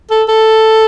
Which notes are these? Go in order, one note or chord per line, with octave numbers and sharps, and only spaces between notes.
A4
A4